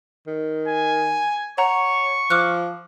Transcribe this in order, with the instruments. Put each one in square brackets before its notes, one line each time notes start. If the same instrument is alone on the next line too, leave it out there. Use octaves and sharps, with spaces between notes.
[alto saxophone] D#3
[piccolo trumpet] G#5
[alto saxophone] C#5 [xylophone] F#5 A#5 [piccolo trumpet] C#6
[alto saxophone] F3 [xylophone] D6 F6 F#6